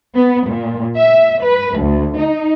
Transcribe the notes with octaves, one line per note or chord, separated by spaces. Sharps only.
B3
A#2
E5
B4
D2
D#4